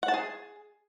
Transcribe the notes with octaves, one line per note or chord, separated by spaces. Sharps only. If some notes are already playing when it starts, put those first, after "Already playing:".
F#5
A5
G#4